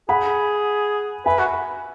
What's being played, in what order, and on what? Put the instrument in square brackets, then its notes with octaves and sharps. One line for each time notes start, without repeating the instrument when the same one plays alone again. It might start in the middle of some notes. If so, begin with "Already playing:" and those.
[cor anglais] G#4 [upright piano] F#5 B5
[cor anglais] B4 [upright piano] E5 G#5
[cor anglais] F#4